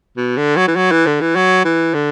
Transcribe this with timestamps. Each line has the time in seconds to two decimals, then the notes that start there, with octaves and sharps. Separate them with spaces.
0.17 B2
0.38 D3
0.57 F#3
0.68 E3
0.76 F#3
0.92 E3
1.07 D3
1.21 E3
1.36 F#3
1.65 E3
1.94 D3